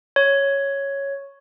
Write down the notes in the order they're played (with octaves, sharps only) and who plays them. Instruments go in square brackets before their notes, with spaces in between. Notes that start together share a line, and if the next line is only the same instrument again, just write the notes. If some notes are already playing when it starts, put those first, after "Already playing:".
[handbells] C#5